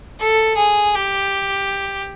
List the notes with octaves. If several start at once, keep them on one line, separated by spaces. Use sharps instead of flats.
A4
G#4
G4